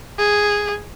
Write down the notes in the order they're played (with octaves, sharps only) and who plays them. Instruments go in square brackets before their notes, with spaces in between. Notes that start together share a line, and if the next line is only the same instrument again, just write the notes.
[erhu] G#4